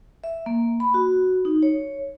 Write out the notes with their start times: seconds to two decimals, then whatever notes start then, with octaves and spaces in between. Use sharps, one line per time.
0.24 E5
0.46 A#3
0.80 B5
0.94 F#4
1.45 D#4
1.63 C#5